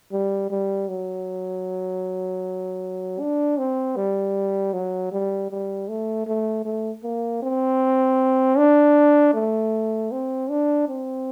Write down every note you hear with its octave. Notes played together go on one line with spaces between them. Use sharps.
G3
G3
F#3
D4
C4
G3
F#3
G3
G3
A3
A3
A3
A#3
C4
D4
A3
C4
D4
C4